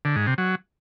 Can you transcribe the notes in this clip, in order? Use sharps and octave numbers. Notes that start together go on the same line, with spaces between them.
D3
G#2
C3
F#3